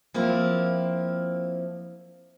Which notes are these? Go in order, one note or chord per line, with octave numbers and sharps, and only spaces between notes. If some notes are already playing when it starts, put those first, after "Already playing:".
F3 A#3 C4 E4